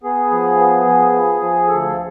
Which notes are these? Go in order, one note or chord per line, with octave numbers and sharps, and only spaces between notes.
B3 G#4
F3
B3
F3
F3
F3
D2 A4